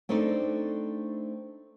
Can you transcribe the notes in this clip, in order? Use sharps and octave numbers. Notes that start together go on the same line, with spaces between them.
A3 C4 D4 D#4 A4 D5